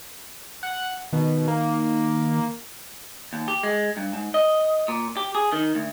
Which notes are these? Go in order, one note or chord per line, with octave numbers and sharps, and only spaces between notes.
F#5
B2 D#3
A#3
D#2
G4
G#3
G2
G#2
D#5
A#2
G4
G#4
D#3
D2